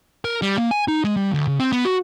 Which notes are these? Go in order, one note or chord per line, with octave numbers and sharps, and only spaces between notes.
A#4
G3
A#3
G#5
D#4
G#3
G3
D2
C#3
C4
B3
F#4